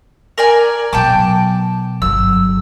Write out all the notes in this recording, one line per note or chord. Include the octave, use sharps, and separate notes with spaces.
A#4 D5 G#5
B2 F#3 G5 A5 D6
G1 F#3 E6